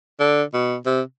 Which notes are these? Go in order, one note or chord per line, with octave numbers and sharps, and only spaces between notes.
D3
B2
C3